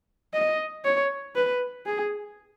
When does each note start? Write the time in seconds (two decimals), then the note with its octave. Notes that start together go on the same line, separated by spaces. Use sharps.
0.34 D#5
0.85 C#5
1.36 B4
1.86 G#4